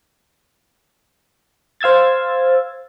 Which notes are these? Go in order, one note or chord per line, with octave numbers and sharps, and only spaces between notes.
C5 F5 E6 G#6 A6